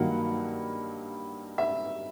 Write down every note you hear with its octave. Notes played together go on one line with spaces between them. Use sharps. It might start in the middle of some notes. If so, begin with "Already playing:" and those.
Already playing: G2 D#3 F#3 A#3 F#5
E5